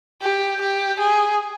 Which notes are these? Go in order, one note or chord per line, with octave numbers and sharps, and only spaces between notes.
G4
G4
G#4